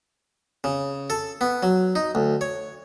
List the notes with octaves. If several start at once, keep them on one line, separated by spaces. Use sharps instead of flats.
C#3
A4
B3
F#3
D#4
D2
C#5